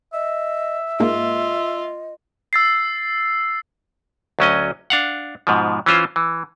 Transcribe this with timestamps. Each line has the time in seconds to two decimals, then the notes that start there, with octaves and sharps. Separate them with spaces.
0.13 D#5 E5
1.00 G#2 G#3 A#3 F4 D#5
2.53 E6 A6 C7
4.39 D2 F#3 C#4 D#5
4.90 D4 F5 F#5
5.47 G#2 B2 F3
5.86 E3 C#4 F4 C5
6.16 E3